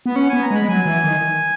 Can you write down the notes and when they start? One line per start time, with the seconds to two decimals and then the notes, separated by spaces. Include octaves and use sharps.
0.06 B3
0.15 C#4 F#5
0.29 B3 G#5
0.42 A#5
0.51 G#3
0.55 B5
0.62 G#3
0.68 F#3 G#5
0.85 E3
1.04 D#3